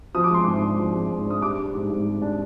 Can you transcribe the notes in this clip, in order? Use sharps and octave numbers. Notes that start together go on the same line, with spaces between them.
F3 D#6
D6
G#3 C6
G#2 D6
D4
F3
G#3
G#2
D4 D#6
G3 D6
D4
G#2
G#2
G3
D4